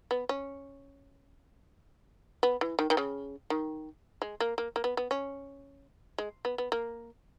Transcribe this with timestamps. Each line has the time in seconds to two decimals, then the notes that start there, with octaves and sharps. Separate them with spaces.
0.11 B3
0.29 C#4
2.43 B3
2.61 E3
2.79 D#3
2.90 D#3
2.97 C#3
3.50 D#3
4.22 G#3
4.40 A#3
4.58 A#3
4.76 A#3
4.84 B3
4.97 B3
5.11 C#4
6.18 G#3
6.45 B3
6.58 B3
6.72 A#3